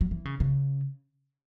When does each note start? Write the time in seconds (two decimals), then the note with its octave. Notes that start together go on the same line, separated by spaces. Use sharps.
0.01 F#3
0.11 E3
0.25 C#3
0.40 C#3